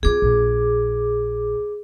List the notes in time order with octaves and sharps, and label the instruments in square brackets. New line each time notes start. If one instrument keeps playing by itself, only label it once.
[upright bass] C4 F4 [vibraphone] G#4 D6
[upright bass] A#1